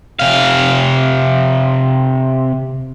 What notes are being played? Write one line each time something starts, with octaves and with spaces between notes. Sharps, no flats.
C3 F5